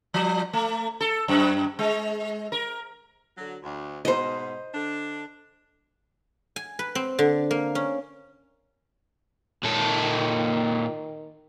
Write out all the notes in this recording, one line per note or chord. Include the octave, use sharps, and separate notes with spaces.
F3
A3
A4
F#2
G#3
A#4
D3 F#3
D2
G#2 B2 C5 D#5
D3 D4
G#5
B4
C4
D3
A#3
C#4
A#2 D#3 A4